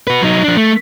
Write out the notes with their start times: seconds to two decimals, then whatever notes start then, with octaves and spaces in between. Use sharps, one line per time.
0.07 F#4 B4
0.22 F#3 D#4
0.44 F3 D4
0.57 A3